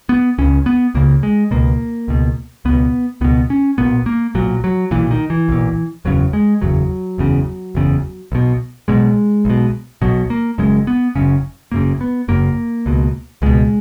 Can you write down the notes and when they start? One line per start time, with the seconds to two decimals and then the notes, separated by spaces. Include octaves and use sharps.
0.09 B3
0.38 C#2 C#3 C#4
0.66 B3
0.95 C#2 C#3 A#3
1.23 G#3
1.51 C#2 B2 A#3
2.08 C#2 B2
2.65 C#2 B2 B3
3.21 C#2 B2 B3
3.50 C#4
3.78 B1 A#2 B3
4.06 A#3
4.35 B1 A#2 F#3
4.64 F#3
4.91 B1 A#2 E3
5.11 D#3
5.30 E3
5.48 B1 A#2
6.05 F#1 E2 C#3 F#3
6.33 G#3
6.62 F#1 E2 C#3 F#3
7.18 F#1 E2 C#3
7.75 F#1 E2 C#3
8.32 B1 B2
8.88 B1 B2 G#3
9.45 B1 B2
10.02 B1 B2 F#3
10.30 A#3
10.58 F#1 F#2 C#3 G#3
10.87 B3
11.15 F#1 F#2 C#3 C#4
11.72 F#1 F#2 C#3 A#3
12.01 B3
12.28 F#1 F#2 C#3 A#3
12.86 C#2 B2
13.42 C#2 B2 G#3